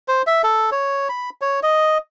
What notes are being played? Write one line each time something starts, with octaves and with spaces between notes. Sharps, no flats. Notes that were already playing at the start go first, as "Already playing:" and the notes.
C5
E5
A4
C#5
B5
C#5
D#5